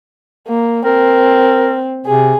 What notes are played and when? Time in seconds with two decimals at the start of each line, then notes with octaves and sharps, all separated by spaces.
0.48 A#3
0.85 C4 A#4
2.06 C3 G#4